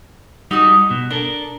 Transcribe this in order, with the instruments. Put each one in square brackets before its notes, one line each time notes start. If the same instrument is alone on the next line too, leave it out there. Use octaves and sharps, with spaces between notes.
[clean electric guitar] G3 D#4 F#4 [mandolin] D#5 D#6
[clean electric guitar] B2
[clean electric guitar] D4 A4 [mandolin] A#4